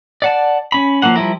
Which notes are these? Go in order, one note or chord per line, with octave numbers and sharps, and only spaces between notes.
D5 F#5 A5
C#4 B5
F3 F#3 A#3 F#5
F3 G3 E4 A#4